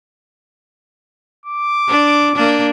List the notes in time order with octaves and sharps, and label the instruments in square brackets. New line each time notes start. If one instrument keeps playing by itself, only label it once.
[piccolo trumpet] D6
[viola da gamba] D4
A#3 D4